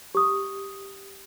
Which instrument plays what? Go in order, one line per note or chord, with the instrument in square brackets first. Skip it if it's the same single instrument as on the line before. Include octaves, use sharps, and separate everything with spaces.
[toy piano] G4 D#6